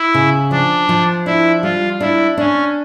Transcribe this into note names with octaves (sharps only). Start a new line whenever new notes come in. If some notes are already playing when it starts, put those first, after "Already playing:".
Already playing: E4
C#3
F3 D4
F3
D4 E4
G3 F4
D4 E4
C#4 D4